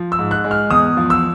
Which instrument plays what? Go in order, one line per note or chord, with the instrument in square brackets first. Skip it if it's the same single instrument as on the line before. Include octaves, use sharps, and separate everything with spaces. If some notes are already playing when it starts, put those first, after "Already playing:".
Already playing: [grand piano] F3
E6
G#2
F#6
G#3
F6
E2 D#6
F3
E6